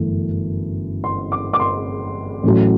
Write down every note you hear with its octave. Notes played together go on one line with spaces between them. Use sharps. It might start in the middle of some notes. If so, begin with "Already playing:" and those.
Already playing: G1 F#2 E3 A3
C6
D6
D6
C6
A1 A2 F#3